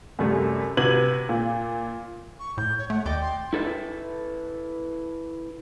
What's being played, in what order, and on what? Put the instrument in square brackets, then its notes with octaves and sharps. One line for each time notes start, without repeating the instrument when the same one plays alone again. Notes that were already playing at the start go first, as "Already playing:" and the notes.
[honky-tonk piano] F#2 C3 G3 A3
C3 F#4 B4 G#6 D#7 F#7
A#2
[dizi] C#6
[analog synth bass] A2 [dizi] G6
[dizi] C#5
[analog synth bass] A3 [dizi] F#5
[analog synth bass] D#2 [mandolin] D5 G5 D6 [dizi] D#5
[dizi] C6
[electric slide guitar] E4 A4 B4 E5